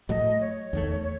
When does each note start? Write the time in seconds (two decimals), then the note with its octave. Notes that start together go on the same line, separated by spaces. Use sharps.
0.09 A2 F#3 A3 D#5
0.41 C#5
0.73 E2 D#3 A3